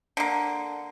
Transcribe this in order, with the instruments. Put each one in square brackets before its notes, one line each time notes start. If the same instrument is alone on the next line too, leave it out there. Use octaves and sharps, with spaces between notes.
[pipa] D3 A#3